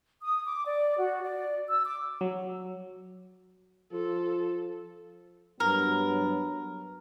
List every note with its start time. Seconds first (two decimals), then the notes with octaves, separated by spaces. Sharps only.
0.22 D#6
0.46 D6
0.65 D5
0.98 F#4
1.23 D5
1.68 E6
1.85 D6
2.21 F#3
3.93 F3 F4 A4
5.60 G2 F#3 B3 A#4